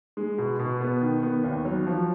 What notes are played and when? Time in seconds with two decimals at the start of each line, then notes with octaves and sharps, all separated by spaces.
0.17 G#3
0.38 B2
0.59 B2
0.81 B3
1.01 D#3
1.23 B3
1.44 D#2
1.65 F#3
1.86 F3